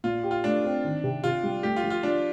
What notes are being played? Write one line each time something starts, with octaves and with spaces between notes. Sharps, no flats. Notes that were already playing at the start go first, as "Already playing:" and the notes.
A#2 F4
G4
F4
A3 D4
C4
D#3
C3
C3 F4
G3
A3 G4
F4
F3
F4
F3 D4